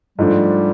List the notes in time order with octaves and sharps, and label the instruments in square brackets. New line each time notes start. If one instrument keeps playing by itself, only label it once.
[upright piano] G#2 F3 A3 D4 [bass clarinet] G3